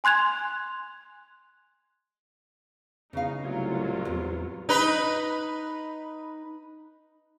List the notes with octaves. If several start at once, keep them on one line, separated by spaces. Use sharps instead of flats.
G#5 C6 F#6 G#6 F7
E2 C#3 D#4 F5
C2 A2 F#3 F4
E2
D#4 B4